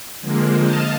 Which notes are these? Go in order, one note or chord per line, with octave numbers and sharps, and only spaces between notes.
D3 F3 G#3 A#3 C4
D#5 F5 A5